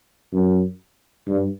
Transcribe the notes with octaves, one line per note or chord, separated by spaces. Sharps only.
F#2
G2